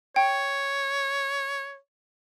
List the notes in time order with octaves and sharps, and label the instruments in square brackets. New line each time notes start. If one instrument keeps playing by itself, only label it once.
[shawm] C#5 [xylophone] G5